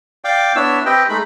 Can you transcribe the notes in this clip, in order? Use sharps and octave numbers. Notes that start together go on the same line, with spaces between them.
D5 F5 G5 D6
B3 D4 E4 C#5 E6
C4 G4 B4 D#5 G5
G#3 A3 D#4 B5